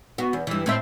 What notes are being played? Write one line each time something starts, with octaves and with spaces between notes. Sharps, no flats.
B3 F#4
E2
G2 E3
A2 C4 E5